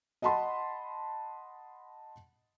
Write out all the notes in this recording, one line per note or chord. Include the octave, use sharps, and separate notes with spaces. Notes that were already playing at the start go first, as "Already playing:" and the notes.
D#5 F#5 A5 B5 C6